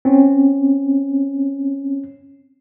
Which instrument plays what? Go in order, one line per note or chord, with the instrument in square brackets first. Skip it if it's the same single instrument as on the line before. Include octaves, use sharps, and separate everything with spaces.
[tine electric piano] C4 C#4